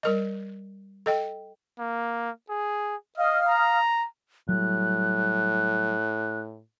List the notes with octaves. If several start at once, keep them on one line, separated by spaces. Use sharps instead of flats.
G3 A#4 D#5
A4 D#5 G5
A#3
G#4
D#5 F5 D#6 F6
A#5
A2 F#3 G3 F#6